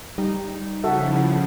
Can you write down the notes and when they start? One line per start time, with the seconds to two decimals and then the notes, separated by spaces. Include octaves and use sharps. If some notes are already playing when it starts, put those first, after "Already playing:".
0.18 G3 D#4
0.84 C#3 F3 F#4 A4 E5
1.12 E4